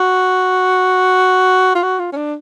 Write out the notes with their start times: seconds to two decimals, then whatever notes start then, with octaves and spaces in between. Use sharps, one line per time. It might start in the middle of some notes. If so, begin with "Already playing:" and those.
Already playing: F#4
1.75 F4
1.83 F#4
2.00 F4
2.12 C#4
2.17 D4